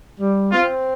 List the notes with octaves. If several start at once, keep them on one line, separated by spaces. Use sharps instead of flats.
G3
C4 F4